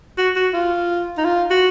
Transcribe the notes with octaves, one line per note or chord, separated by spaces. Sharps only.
F#4
F#4
F4
D#4
F4
F#4